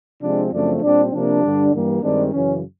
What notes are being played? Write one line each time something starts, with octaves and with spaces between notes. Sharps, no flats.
C3 F3 G#3 C4 D4
F#2 C#3 F3 A3 C4 D4
A#2 G3 C4 D4
C3 F3 A#3 D4
G2 D3 G3
G2 E3 G3 A#3
G2 D#3 G#3 C4 D4
F#2 C#3 E3 C#4